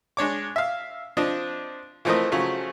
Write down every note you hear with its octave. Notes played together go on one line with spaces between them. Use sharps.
G#3 D4 C#5 D6
E5 F5
F3 C4 D4 D#5
E3 F3 A3 C4 A#4 D#5
C#3 F3 F#3 A3